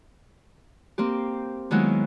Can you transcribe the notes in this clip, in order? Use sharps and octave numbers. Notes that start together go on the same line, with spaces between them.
A#3 C4 G4
D#3 F#3 G#3 A#3 B3 E4